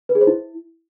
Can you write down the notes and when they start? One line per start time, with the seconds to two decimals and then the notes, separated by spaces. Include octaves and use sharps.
0.09 B4
0.15 G#4
0.21 C5
0.27 E4